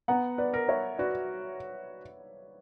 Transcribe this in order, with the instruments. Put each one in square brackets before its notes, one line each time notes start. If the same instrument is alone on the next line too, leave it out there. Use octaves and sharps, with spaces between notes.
[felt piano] B3 [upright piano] F#5 A#5
[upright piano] B4 D5
[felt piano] A#4
[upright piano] C#5 E5
[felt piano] F#4 [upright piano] B4 D5